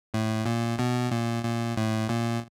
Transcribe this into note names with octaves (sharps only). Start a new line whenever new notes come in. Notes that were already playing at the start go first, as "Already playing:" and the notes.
A2
A#2
B2
A#2
A#2
A2
A#2